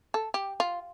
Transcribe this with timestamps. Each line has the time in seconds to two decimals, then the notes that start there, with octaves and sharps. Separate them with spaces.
0.14 A4
0.34 G4
0.60 F4